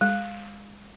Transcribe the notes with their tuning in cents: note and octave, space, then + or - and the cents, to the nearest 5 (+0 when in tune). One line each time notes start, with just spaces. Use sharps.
G#3 -30